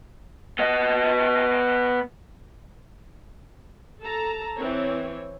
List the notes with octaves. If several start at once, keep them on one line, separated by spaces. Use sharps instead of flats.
B3 D#5
A4 A5 A#5
E3 C4 C#5